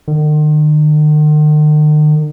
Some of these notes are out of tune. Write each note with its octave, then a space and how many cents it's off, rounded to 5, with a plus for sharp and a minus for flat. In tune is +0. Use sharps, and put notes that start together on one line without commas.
D#3 -45